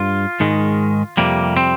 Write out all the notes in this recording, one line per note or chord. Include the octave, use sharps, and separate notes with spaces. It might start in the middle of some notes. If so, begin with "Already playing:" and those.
Already playing: G2 F4
G#2 D#3 G#3
F2 C3 G3 A#3
C4